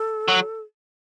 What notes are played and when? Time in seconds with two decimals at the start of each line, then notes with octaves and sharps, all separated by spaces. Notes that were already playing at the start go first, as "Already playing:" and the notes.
Already playing: A4
0.28 F#3